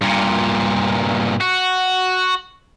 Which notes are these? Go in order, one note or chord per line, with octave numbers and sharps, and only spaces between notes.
G2 A#2
F#4